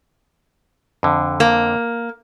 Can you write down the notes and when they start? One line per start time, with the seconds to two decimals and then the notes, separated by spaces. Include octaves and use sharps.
1.03 F2 D3
1.40 A#3